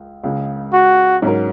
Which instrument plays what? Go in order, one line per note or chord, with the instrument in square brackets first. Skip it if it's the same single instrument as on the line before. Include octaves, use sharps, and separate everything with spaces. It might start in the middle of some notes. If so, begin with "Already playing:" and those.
Already playing: [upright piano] C#2 G#3
C#2 C#3 G#3
[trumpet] F#4
[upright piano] G#2 F#3 C#4 F#4 A#4